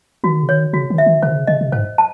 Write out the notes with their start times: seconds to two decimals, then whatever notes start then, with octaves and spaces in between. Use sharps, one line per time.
0.24 D#3 F#4
0.43 C#3
0.49 D#3 C#5
0.73 C#3 F#4
0.90 D#3
0.98 E5
1.06 D#3
1.22 C3 C5
1.30 D#3
1.35 C#3
1.47 C#3 D#5
1.61 C3
1.72 G#2 C5
1.98 A5